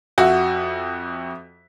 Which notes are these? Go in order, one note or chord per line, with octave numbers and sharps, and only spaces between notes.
F2 F#4 E5